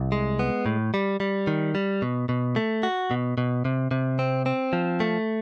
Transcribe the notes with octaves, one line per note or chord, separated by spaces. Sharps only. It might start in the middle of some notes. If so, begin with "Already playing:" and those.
Already playing: C2
G#3
B3
A2
G3
G3
D#3
G3
B2
B2
A3
F#4
B2
B2
C3
C3
C4
C4
F3
A3